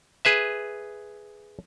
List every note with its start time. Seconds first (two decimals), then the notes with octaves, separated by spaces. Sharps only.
0.25 G#4 B4 E5